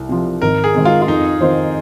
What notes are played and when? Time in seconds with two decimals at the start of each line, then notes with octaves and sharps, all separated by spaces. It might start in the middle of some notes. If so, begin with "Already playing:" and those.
Already playing: C2
0.09 C3 F3
0.42 G#1 A#4
0.64 G#4
0.75 G#2 D#3 C4
0.85 F4
1.02 F4
1.08 F2 D#4
1.41 D#3 C4 F4 C5